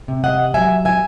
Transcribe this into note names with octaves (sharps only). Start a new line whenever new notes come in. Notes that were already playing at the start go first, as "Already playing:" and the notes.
C3
D#5 F#5
F#3 E5 G#5
E5 G#5